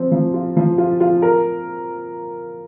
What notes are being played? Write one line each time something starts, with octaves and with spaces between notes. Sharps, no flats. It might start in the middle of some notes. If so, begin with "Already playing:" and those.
Already playing: F3 C4
F3
F4
F3
F4
F4
A#4